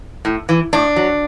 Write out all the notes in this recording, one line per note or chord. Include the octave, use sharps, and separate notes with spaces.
A2
E3
A2 D4
F#3